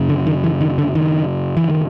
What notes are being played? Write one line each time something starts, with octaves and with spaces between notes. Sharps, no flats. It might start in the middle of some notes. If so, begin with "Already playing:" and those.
Already playing: F#2 C#3
D3
D#3
E3
D#3
D3
D#3
E3
D#3